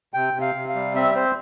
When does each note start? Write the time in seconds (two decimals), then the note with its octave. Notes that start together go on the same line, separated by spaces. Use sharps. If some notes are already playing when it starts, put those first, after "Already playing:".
0.14 C3 G5
0.33 C3
0.41 F5
0.55 C3
0.68 F5
0.75 G3
0.95 C4 E5
1.15 C4 C5